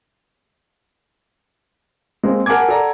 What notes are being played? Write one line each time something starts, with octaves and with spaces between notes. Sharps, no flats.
G#3 A#3 C4
A#4 F#5 G#5 A5 D6 G#6
A4 D5 F#5 A#5